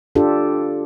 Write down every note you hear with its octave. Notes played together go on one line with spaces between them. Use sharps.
D4 F4 G4 A4